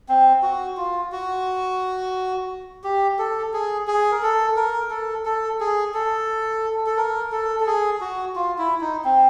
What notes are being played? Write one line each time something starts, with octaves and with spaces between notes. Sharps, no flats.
C4
F#4
F4
F#4
G4
A4
G#4
G#4
A#4
A4
A#4
A4
A4
G#4
A4
A4
A#4
A4
A4
G#4
F#4
F4
E4
D#4
C4